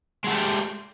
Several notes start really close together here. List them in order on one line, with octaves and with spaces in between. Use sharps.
G#3 F#4 A3 G4